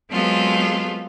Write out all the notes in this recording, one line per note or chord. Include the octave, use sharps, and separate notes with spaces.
F#3 G#3 B3 C4 F4 A4